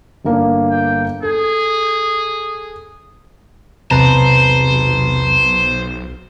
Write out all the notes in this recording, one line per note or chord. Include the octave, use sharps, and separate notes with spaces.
G1 A#3 D4
G5
G#4 A4
B1 E2 C3 B4 C5 A5 A#5